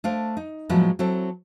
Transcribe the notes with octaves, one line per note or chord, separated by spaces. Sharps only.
A3 D4 C5 F5
D#4
A2 F3 F#3 G#3 B3 E4
F#3 C4 E4 A4